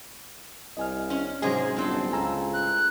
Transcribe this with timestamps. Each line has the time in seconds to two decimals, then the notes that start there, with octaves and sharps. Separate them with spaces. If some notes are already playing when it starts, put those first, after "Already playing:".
0.77 C2 D#5 G#5 F6
1.10 C#4
1.42 G#2 C3 F#3 G#3 C#4 G#4
1.76 G1 A2 C4 A4
2.13 C#2 G#5 A#5 E6
2.54 F#6